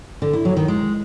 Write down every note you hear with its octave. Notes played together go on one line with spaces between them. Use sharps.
D3
E4
F#3
D#3
G#3